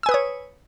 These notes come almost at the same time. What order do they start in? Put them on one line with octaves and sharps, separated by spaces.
E6 G#5 B4 D#6 C#5